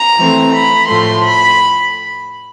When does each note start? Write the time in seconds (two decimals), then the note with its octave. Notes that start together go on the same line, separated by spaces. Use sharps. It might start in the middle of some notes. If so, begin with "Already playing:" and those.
Already playing: A#5
0.18 E3 A3 C4
0.53 B5
0.88 A2 F3 A3 C6
1.24 B5